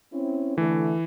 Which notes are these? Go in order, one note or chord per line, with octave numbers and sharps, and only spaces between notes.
C4 C#4 E4
D3 E3 A3